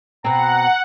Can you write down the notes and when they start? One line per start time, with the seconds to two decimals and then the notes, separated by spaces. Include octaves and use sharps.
0.24 B2 C4 F#5 A#5